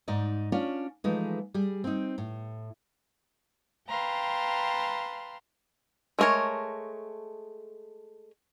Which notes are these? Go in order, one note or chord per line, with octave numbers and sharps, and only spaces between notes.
G#2 D#4 D5 D#5
C#4 D4 F4 C#5 D5
E3 F3 G#3 A3 D#4
G3 G#4
C4 D#4
A2
B4 F5 G5 A5 A#5 C6
G#3 A3 B3 A#4 C#5